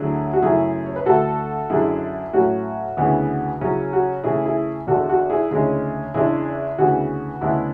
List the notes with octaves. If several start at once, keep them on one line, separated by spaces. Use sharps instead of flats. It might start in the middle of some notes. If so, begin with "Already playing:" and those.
Already playing: D2 D3 F#3 E4 G#4
F#4
F#2 C#3 E3 A3 E4 G#4
C#5
B4
D2 D3 A3 F#4 A4
F#2 D3 G#3 D4 E4 G#4
A2 F#3 C#4 F#4
D2 C#3 E3 B3
C#3 F#3 C#4 E4
F#4
C#3 E3 A3 E4 G#4
E4 G#4
E2 D3 G#3 F#4 A4
F#4
E4 G#4
D2 C#3 G#3 C#4 E4 G#4
E2 C#3 G#3 D4 E4 G#4
D2 C#3 E3 B3 F#4
D2 C#3 G#3 B3 D4 E4